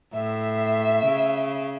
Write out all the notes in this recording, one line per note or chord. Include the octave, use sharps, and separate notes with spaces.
A2 E5
C#3